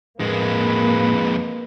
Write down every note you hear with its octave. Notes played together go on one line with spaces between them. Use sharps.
F2 A2 G#3 A#3 B4